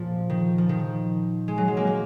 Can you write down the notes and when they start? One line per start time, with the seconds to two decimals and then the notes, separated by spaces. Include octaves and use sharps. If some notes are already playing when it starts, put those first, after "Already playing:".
Already playing: A#2 F3
0.30 D#3
0.58 F3
0.69 D#3
1.48 G#3
1.58 F#3
1.68 G#3
1.77 A#3
1.87 A#3